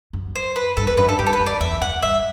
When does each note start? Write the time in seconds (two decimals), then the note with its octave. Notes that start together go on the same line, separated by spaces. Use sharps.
0.13 F#2
0.35 C5
0.56 B4
0.77 G2 A4
0.87 E2 B4
0.97 F#2 B4
1.08 G2 A4
1.19 G2 G4
1.27 A4
1.33 B4
1.40 F#2
1.46 D5
1.60 E2 E5
1.81 F#2 F#5
2.02 G2 E5